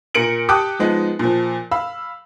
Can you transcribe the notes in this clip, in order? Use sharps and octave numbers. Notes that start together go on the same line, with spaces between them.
A#2 A#4 C#7 D7 F#7
G4 G5 A5 D6 D#6 F#6
F3 G#3 B3 D#4
A#2 F3
F5 B5 E6